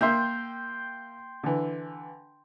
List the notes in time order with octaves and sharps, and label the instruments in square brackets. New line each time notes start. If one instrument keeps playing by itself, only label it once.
[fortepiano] A#3 E5 [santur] G5 C6
[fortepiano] D3 E3